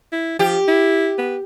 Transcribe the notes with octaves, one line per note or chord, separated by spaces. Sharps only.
E4
F3 G4
E4
B3